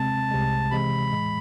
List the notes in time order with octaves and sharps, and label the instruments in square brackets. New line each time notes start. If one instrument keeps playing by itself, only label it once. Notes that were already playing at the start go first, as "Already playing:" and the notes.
Already playing: [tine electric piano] C3 G#3 C4 [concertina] A5
[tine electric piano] C2 C3 G#3
[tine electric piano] C3 E3 G#3 [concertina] B5
[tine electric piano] A2 E3 G#3